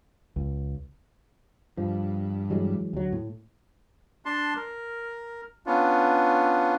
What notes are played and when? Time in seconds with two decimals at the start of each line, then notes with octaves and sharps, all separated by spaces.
0.36 C#2
1.78 G2 F3
2.50 E3 F#3 G#3
2.93 D2 F#3
3.12 A2
4.25 D4 A5 C6
4.56 A#4
5.66 B3 C#4 D4 F4